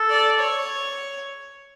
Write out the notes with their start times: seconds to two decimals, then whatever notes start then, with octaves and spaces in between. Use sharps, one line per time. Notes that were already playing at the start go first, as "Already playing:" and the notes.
Already playing: A4
0.10 D5
0.39 C#5